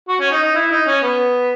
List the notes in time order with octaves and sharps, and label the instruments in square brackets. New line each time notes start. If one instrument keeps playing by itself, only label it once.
[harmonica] F#4
C#4
D#4
D#4
E4
D#4
C#4
B3